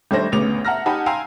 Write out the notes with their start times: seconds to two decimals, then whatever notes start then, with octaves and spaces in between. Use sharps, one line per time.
0.11 G#1 G3 A3 D4 C5 A#6
0.32 A1 D2 C#3 B3 D6 F7
0.65 E5 F#5 A5 A#5 F6 A#6
0.86 D#4 G4 F#5 G#5 A5 B5
1.06 F5 G5 G#5 A#5 C6 E6